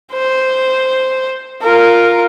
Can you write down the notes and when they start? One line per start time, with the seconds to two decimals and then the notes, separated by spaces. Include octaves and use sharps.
0.12 C5
1.61 F4 A#4